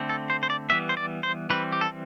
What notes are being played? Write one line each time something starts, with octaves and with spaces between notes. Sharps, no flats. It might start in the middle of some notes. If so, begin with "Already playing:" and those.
Already playing: D3 A3 C4
A4
C5
C5
D5
E3 G3 B3 E5
C5
D5
C5
E3 G3 C4 B4
G4
A4